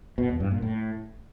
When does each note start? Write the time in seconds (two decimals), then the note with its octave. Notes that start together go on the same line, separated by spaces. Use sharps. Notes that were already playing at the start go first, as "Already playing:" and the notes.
0.18 B2
0.29 E2
0.40 G2
0.51 A#2
0.62 A2